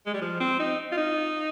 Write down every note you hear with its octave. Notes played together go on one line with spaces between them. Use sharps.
G#3
G3
F3
C4
D#4
F4
D#4